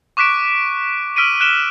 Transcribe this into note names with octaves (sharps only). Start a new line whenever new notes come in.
C#6 D6 F#6 B6 D7
E6 F6 B6 D7 D#7
F#6 D7 E7 G7